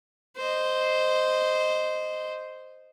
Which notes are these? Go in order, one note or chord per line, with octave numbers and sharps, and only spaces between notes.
C5 D#5